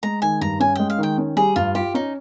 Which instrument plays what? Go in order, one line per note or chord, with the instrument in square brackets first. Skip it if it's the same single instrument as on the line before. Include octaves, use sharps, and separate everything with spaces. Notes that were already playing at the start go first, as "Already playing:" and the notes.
[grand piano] G#3 [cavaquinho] A#5
[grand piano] D#3 [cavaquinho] G#5
[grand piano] G2 [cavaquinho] A#5
[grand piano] C#4 [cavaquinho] G#5
[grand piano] G#3 [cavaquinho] G5
[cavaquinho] F5
[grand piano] D#3 [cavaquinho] G5
[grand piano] C#4
[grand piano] G3 [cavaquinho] G#4
[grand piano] G2 [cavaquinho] F4
[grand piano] F4 [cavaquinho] G4
[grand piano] C#4 [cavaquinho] D#4